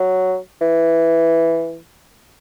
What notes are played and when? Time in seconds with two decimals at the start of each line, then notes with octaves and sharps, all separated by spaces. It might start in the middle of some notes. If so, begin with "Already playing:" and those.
Already playing: F#3
0.61 E3